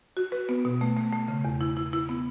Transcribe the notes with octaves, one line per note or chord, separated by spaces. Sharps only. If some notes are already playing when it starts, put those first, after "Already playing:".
F#4
B4
B3
B2
A3
A3
A3
C#3
E2
E4
E4
E4
B3